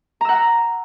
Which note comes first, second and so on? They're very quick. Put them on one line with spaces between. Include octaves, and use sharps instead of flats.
A#5 E6 F#5